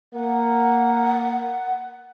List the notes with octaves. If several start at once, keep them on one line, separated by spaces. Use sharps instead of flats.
A#3 F#5